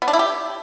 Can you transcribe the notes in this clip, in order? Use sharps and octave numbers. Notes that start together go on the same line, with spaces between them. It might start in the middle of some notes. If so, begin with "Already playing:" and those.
B3
D4
E4
G4